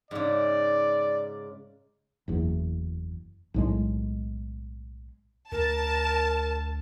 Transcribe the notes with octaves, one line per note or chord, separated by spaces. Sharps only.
G#2 C#3 D5
F#1 E2
B1 A2 G#3
D2 A#4 A5